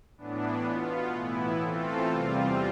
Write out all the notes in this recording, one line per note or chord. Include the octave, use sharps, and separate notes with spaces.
A2 E3 B3 D4
B2 B3 F4
A2 E3 B3 E4
E3 A3 C4 F4 A4
E2 C3 G3 C4 F4